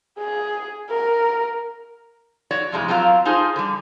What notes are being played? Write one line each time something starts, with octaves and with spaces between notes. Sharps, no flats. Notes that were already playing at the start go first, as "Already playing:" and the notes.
G#4
A#4
F#4 C#5 D5
F2 A2 C3 G#3 E4
F#3 C4 F4 F#4 F5 A#5
D#4 F4 G#4 A4 C5
D3 G3